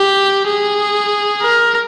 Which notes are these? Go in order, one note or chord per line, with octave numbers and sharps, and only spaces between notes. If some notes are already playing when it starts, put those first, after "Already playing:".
Already playing: G4
G#4
A#4